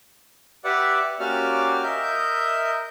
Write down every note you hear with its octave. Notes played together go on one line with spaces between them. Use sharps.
G4 B4 D5 E5 F#5
A#3 C#4 F#4 G4 D5 F6
A#4 D#5 E5 G6